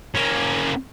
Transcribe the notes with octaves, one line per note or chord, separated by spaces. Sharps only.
A#3 C#4